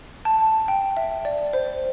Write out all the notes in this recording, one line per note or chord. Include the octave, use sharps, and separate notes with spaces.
A5
G5
E5
D5
C5